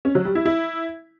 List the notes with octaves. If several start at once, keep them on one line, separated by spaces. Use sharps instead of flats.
C#4
F#3
G3
E4
E4